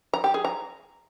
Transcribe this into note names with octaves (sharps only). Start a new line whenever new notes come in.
A#5
G4
G#4
A#5